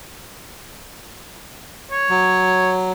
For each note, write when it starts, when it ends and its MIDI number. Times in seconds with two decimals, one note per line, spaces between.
1.91 2.74 73
2.10 2.92 54